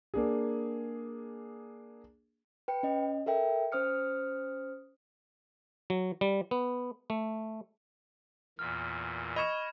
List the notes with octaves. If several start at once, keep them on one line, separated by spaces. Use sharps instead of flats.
A#3 D4 G#4
B4 G5 C#7
C#4 D#5
A4 A#4 E5 G5
C#4 C5 D#6 F6 C#7
F#3
G3
B3
A3
E2 A#2 F6
D#5 B5 C#6 G#6 E7